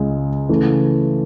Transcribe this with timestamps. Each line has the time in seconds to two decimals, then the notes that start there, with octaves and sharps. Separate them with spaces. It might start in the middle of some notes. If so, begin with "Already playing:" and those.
Already playing: C#2 C#3 G#3
0.49 C#3 E3 A3